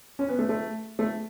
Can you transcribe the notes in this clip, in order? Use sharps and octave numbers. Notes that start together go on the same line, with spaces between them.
C#4
B3
A3
A3
A3